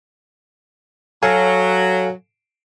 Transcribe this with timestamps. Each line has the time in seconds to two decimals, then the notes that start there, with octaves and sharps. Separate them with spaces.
1.23 F#3 A4 F5 G#5